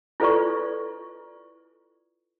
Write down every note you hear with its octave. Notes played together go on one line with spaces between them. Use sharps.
E4 F4 A4 B4 D5 C#6